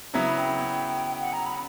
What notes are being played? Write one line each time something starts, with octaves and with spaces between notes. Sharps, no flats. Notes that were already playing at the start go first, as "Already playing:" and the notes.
C#3 F#3 B3 E4 A#5
B5
G5
F#5
A#5
B5